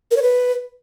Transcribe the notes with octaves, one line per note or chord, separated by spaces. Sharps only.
A#4
C#5
B4